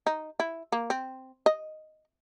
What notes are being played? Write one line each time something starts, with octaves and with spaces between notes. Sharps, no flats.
D#4
E4
A#3
C4
D#5